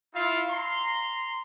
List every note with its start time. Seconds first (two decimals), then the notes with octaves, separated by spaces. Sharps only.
0.15 E4 F4 F5
0.50 A#5 C6